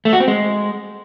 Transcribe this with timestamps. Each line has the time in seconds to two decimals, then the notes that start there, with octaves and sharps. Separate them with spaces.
0.05 A3
0.13 F#4
0.20 C4
0.28 G#3